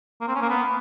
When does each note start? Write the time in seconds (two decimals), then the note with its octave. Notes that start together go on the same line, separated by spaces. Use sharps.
0.21 A#3
0.28 C4
0.35 C#4
0.42 A#3
0.49 B3